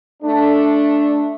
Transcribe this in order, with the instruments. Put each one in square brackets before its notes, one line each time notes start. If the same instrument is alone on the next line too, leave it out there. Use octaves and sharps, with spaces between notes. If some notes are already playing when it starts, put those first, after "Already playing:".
[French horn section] A3 D4